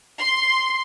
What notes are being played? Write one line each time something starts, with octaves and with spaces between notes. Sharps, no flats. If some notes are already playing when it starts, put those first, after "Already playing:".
C6